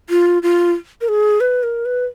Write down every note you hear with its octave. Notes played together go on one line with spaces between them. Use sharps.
F4
F4
A#4
G#4
B4
A#4
B4